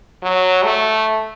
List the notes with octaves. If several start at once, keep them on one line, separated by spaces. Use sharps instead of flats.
F#3
A3